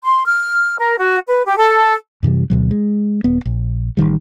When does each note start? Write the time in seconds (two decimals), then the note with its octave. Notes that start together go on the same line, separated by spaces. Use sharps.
0.03 C6
0.25 F6
0.78 A#4
0.97 F#4
1.27 B4
1.46 G4
1.58 A4
2.23 F#2 C3 E3 G3
2.50 D2 B2 F#3
2.71 G#3
3.24 D#1 B3
3.46 A#1
3.97 A1 G#2 D#3 G3